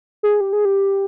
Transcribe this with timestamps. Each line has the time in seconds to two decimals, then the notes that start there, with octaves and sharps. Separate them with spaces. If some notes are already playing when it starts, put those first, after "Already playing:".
0.23 G#4
0.40 G4
0.53 G#4
0.65 G4